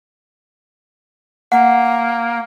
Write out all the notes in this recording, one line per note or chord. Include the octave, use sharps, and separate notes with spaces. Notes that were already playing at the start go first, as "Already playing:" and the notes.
A#3 F#5